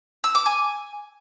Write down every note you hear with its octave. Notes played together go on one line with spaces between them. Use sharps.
E6
D6
G#5